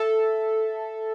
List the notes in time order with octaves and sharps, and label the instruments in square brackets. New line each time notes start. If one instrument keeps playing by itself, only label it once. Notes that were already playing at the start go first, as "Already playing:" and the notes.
Already playing: [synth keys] A4 E5